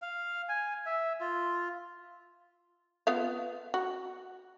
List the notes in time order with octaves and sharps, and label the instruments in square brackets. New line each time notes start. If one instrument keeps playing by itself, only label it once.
[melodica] F5
G#5
E5
F4
[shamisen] B3 F4 F5
F#4